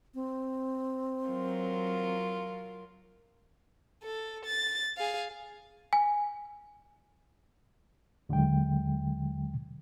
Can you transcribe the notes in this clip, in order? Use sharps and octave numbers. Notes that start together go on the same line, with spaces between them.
C4
F#3 F4 A#4
A4
A6
G#4 F5
G#5
D#2 D3 F#3 G#3 G5